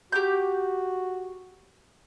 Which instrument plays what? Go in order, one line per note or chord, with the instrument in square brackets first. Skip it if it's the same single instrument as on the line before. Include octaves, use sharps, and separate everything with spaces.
[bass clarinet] F#4 [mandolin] G4 D6 G6